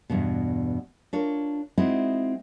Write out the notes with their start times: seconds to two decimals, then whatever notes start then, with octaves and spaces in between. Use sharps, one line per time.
0.10 E2 G2 B2
1.13 D4 F4 A#4 C#5
1.78 G#3 C4 D#4 E4 F#4